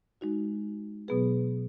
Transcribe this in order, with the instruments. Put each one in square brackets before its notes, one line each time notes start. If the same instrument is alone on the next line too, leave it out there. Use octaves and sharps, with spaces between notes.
[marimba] G#3 D#4 F#4
B2 F#3 B3 G#4 B4